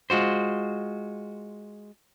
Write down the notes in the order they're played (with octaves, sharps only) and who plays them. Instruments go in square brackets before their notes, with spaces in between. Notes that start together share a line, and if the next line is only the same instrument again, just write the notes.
[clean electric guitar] G#3 F4 F#4 C5